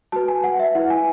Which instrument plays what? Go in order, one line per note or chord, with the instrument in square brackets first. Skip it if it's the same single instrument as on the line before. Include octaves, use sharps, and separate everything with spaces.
[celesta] F#4 B4 A5
G#5
F#5
E5
E4 F#5
B4
G#5